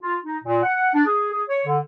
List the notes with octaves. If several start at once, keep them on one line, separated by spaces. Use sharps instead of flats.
F4
D#4
A#2
F#5
D4
G#4
G#4
C#5
D3